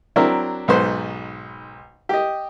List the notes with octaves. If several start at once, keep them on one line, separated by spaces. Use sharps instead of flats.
F#3 C4 D4 E4 A#4
B1 G#2 B3 B4 C5
G4 D#5